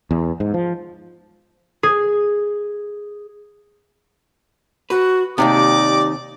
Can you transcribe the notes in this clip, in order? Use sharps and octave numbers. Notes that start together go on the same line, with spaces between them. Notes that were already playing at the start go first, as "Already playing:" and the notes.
E2
G#2
F3
G#4
F#4 B4
D#2 A2 C3 D#4 D5 D6